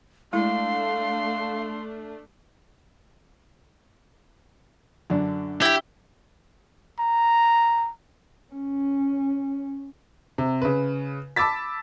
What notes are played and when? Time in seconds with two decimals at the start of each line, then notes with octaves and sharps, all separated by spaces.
0.33 G#3 A3 D4 E4 F5 C6
5.10 F#2 D3 D4
5.62 E4 G4 G5
7.00 A#5
8.53 C#4
10.38 C3
10.62 C#3 B4
11.36 A5 B5 D6 E6 A6 B6